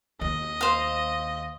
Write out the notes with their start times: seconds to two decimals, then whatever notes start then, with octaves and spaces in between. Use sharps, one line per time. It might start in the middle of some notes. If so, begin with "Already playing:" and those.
0.21 D#2 D#5
0.61 C5 F5